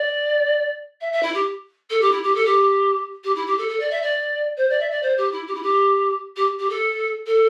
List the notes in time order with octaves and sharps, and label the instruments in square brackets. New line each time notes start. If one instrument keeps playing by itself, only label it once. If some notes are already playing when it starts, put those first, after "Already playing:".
Already playing: [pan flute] D5
E5
E5
E4
G4
A4
G4
E4
G4
A4
G4
G4
E4
G4
A4
A4
D5
E5
D5
C5
D5
E5
D5
C5
G4
E4
G4
E4
G4
G4
G4
A4
A4